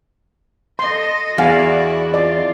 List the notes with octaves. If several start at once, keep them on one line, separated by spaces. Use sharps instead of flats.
A4 D#5 C6
E2 E4 F#4 D5 F5 F#5 G#5
C4 F4 D5 D#5